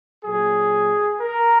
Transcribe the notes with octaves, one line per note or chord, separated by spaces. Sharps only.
A#2 F#3 G#4
A#4